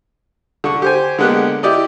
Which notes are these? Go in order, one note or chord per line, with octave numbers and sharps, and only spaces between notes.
D3 C#6
G4 C5 G#5
D3 G#3 A#3 B3 G4 F#6
E4 G4 D5 D#5